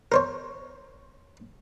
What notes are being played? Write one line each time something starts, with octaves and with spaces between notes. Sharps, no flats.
A#4 C5 C#5